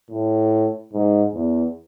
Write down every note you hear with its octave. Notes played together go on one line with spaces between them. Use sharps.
A2
G#2
E2